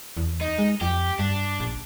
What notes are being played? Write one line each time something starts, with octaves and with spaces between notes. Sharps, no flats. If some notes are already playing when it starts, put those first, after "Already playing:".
E2
D#4
G#3
F2 G4
G2 D4
A#1